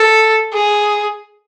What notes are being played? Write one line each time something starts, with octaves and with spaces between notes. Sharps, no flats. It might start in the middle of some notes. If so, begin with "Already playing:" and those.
Already playing: A4
G#4